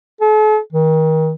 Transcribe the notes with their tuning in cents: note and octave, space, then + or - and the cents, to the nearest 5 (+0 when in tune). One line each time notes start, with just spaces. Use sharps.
A4 -45
D#3 +30